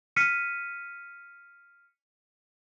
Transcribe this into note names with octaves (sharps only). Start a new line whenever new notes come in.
F6 B6 C#7 D#7